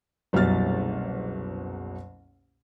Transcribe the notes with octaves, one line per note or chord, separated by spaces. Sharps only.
F#1 C2 B2 F#3 F6 A6